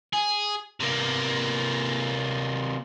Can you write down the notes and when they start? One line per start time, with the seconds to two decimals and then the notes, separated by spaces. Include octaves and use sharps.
0.13 G#4
0.80 C3 A#3